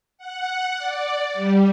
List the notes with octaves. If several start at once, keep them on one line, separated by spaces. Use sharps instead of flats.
F#5
D5
G3